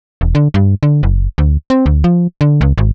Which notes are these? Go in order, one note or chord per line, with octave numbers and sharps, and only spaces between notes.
E1
D3
G2
D3
F#1
D2
C4
D2
F3
D3
C#2
G#1